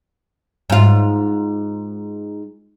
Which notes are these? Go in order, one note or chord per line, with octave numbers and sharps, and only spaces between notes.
G#2 F4